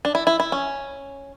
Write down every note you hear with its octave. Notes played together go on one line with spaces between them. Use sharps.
D4
E4
E4
E4
C#4